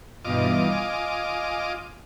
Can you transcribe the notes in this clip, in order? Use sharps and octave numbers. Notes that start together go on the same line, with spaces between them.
G2 B2 E3 F4 D#5 D6
G#5